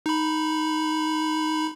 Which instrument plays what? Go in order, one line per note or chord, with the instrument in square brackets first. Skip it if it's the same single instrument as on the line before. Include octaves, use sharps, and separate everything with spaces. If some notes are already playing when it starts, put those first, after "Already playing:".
[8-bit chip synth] D#4 B5